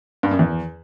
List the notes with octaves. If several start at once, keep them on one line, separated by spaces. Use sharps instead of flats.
G2
F#2
E2